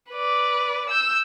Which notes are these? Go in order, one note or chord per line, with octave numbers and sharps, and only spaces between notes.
B4 D5
E6 G6